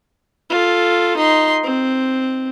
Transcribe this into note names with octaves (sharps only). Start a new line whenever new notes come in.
F4 A4
D#4 C6
C4